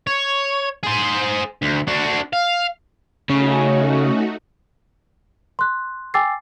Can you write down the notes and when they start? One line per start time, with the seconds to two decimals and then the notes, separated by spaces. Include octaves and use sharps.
0.07 C#5
0.83 G#4 C5
1.62 D2
1.88 D4 F#4
2.33 F5
3.29 C#3 A3 C#4 D#4 F#4
5.59 C6 F#6
6.14 G5 G#5 D6 E6 A6 C7